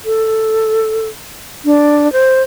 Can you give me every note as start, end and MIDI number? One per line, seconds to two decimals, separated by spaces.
0.05 1.08 69
1.65 2.11 62
2.13 2.42 72